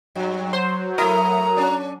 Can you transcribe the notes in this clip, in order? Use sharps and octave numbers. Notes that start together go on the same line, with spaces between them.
G2 F#3
C5 C6
A3 E4 A#4 A#5 D#6
C#4 D4